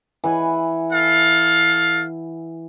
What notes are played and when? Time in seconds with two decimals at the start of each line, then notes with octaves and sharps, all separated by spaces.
0.24 E3 F#5 G#5
0.93 A4 F5